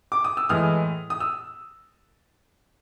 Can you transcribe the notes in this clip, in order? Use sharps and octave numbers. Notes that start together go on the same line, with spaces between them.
D6
D#6
E6
A2 E3 G#3 D#6 F6
D#6
E6